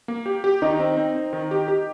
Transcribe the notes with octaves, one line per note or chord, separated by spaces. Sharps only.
A#3
G4
G4
D#3 D#4
C4
C4
C4
D#3
G4
G4